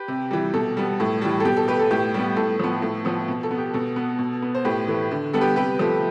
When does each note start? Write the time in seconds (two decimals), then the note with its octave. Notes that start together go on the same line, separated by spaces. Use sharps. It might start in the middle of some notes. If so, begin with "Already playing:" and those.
Already playing: G4 B4
0.08 C3
0.31 E3 G3
0.54 B2 A4
0.77 G3 B3
1.00 A2
1.22 E3 G3
1.40 A4
1.45 B2 G4
1.57 A4
1.68 A3 G4 B4
1.80 A4
1.91 A2 G4
2.14 G3 B3
2.36 A2 A4
2.59 F3 B3
2.82 A2
3.05 F3 B3
3.28 B2
3.43 A4
3.51 B3
3.58 G4
3.74 B2 A4
3.96 B3
4.19 B2
4.42 B3
4.55 C5
4.65 A2 G4 B4
4.88 E3 A3
5.11 D3
5.33 G3 B3 A4
5.41 G4 B4
5.56 C3 G4 B4
5.79 F3 A3